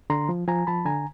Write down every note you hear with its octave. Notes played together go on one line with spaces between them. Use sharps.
D3 A#5 C6
F3
F3 G#5 A#5
F3 A5 B5
D3 G#5 A#5